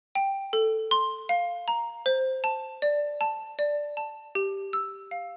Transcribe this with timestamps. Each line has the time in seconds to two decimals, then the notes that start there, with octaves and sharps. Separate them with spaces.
0.15 G5
0.53 A4
0.91 C6
1.29 F5
1.68 A#5
2.06 C5
2.44 A5
2.82 D5
3.21 A5
3.59 D5
3.97 A5
4.35 G4
4.73 E6
5.11 F5